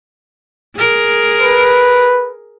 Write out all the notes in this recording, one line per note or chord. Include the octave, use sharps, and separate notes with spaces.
G#4 A#4
B4